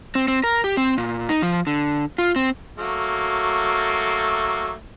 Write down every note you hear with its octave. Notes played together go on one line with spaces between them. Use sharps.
C4
C4
A#4
G4
C4
A#2
D#4
F3
D3
F4
C4
F#3 A3 A#3